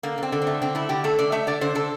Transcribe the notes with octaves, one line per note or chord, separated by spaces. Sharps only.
D3 A#3
D3 C4
D3
C4
A3
D3 C4
A3 E4
D3 G4
A3 A4
D3 D5
A3 E5
D3 D5
D3 C5
D3 A4